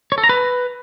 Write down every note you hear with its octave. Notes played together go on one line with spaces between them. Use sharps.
C#5
A4
A#5
B4